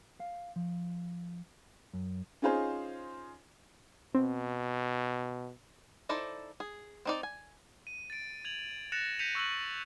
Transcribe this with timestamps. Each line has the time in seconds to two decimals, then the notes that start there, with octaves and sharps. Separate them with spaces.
0.20 F5
0.56 F3
1.93 F#2
2.42 C#4 D#4 F4 G#4 C5
4.15 B2 C4
6.09 D#4 E4 A4 C5 D5
6.60 G#4
7.05 C4 D#4 D5
7.23 G#5
7.87 D#7
8.10 A6 D7
8.45 G#6 F7 F#7
8.92 F#6 A6 A#6 C#7 E7 F7
9.19 G6 A#6 B6 C#7 D#7 F7
9.35 C#6 E6 F#6 D#7 F#7